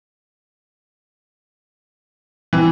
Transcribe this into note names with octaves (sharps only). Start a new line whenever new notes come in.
E3 C4